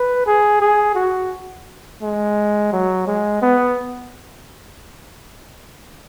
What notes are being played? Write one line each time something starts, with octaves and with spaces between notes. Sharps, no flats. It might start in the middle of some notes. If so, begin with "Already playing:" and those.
Already playing: B4
G#4
G#4
F#4
G#3
F#3
G#3
B3